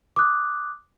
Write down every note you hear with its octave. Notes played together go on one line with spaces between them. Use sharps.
D6 D#6 F#6